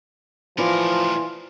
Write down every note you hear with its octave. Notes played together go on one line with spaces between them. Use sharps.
A2 E3 F3 F4 A#4 D5